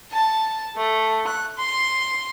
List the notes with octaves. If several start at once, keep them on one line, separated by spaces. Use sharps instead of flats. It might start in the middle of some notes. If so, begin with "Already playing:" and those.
A5
A3
F#6
C6